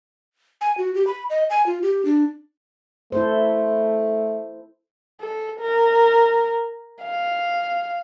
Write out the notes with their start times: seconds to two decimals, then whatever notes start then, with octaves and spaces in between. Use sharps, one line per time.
0.61 G#5
0.78 F#4
0.95 G4
1.07 B5
1.30 D#5
1.50 G#5
1.66 F4
1.83 G4
2.05 D4
3.12 A3 E4 A4 C5
5.21 A4
5.60 A#4
7.03 F5